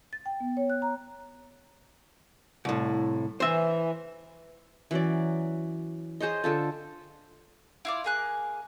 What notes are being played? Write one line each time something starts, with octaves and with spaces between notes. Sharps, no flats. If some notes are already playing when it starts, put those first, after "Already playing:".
A6
G5
B3
C#5
F#6
A#5
C2 A2
E3 C5 E5
E3 F#3 C#4 D5
G#4 C5 C#5 D#5
D3 F4 A4
E4 F4 D5
A#3 G#4 F#6